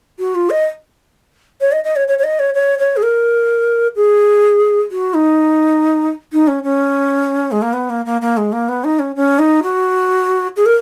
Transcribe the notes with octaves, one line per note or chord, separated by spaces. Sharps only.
F#4
F4
D#5
C#5
D#5
D#5
C#5
C#5
C#5
D#5
C#5
C#5
C#5
G#4
A#4
G#4
F#4
D#4
D#4
C#4
C#4
G#3
A#3
B3
A#3
A#3
A#3
G#3
A#3
B3
D#4
C#4
C#4
D#4
F#4
G#4
A#4